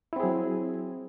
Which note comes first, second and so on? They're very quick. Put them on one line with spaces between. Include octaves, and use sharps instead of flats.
E4 C4 G#4 F#3